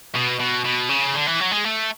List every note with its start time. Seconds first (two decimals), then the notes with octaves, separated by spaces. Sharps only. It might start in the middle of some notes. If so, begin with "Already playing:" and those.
0.15 B2
0.40 B2
0.65 B2
0.89 C#3
1.14 D3
1.27 E3
1.40 F#3
1.52 G#3
1.64 A3